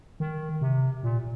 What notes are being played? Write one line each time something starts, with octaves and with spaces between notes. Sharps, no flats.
D#3
C3
A#2